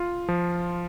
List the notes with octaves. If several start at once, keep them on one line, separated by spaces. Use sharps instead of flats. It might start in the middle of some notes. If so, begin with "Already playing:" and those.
Already playing: F4
F3